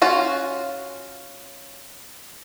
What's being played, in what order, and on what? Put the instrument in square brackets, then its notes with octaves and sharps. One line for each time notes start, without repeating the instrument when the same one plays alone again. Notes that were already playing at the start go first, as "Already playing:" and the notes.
[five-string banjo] C#4 F4 F#4